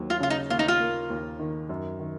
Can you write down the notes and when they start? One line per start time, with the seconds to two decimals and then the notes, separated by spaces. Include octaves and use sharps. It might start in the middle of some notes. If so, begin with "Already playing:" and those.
Already playing: D#2 F#3
0.10 F4
0.20 C#3 F4
0.30 D#4
0.50 D#2 F4
0.59 D#4
0.68 F4
0.80 A#3
1.10 D#2
1.39 D#3
1.69 F#2
2.00 D#3